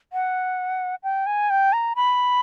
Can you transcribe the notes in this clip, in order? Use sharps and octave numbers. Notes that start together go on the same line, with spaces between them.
F#5
G5
G#5
G5
A#5
B5